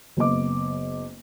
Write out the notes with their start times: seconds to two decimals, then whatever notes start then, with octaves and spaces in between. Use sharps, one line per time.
0.17 F#1 B3 D#5 D6